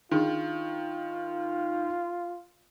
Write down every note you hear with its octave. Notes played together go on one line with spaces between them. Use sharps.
D#3 D4 D#4 F4 G#4